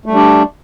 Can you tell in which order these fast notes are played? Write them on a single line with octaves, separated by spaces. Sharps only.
A3 G3 D4